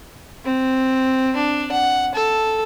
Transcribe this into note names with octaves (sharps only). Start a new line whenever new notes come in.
C4
D4
F#5
A4